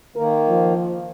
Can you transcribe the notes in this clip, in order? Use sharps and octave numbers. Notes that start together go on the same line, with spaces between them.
D#3 A#3 A#4
F3